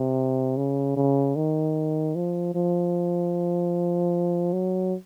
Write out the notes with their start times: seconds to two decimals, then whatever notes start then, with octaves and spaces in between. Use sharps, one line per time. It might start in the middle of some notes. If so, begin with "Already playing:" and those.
Already playing: C3
0.57 C#3
0.97 C#3
1.36 D#3
2.15 F3
2.54 F3
4.53 F#3